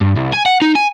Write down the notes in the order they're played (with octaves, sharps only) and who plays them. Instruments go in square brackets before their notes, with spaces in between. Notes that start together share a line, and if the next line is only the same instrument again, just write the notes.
[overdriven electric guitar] G2
C2
G#5
F#5
D#4
G#5